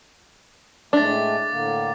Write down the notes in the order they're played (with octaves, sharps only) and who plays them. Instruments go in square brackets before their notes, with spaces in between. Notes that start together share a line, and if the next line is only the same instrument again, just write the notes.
[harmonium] A2 G#3 A3 [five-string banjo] D4 [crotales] D6 A6
[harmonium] A2 D3 A#3